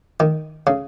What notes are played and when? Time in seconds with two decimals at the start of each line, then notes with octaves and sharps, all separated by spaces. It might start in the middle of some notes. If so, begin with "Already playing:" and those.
0.20 D#3
0.67 C#3